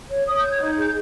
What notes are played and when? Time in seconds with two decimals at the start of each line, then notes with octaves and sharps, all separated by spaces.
0.10 C#5
0.27 C#5 D#6
0.39 C#5 G6
0.52 G#6
0.61 D#4 G6
0.77 G#4 G6